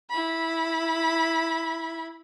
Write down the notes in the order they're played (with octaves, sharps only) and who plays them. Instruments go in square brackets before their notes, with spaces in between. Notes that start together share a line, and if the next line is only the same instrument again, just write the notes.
[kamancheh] E4 B5